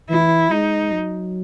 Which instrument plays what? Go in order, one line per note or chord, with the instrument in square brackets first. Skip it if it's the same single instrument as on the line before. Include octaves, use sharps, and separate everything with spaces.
[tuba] E3 [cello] E4
[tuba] G#3 [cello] D#4
[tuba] F#3